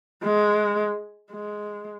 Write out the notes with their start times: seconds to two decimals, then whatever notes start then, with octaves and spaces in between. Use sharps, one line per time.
0.24 G#3
1.32 G#3